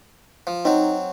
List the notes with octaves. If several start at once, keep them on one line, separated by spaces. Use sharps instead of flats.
F3
F#3 C4 D#4